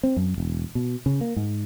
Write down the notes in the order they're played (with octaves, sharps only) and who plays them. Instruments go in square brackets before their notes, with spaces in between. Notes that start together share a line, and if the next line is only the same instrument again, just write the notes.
[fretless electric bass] C4
F#2
E1
B2
C#3
A#3
G#2